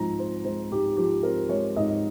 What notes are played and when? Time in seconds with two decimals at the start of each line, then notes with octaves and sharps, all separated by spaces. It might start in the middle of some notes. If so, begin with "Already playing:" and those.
Already playing: G#2 F3 G#3 C4 A#5
0.19 C4 C5
0.44 G#3 C5
0.71 G#2 G4
0.97 F3 G4
1.23 C4 A#4
1.49 G#3 C#5
1.76 G#2 D#5